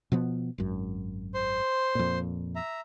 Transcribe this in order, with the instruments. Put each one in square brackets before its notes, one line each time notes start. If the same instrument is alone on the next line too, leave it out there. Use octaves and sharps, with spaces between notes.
[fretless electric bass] B2 F3 B3
G#1 F#2
[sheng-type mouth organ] C5 C6
[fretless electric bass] F2 A#2
[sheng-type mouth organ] E5 A#5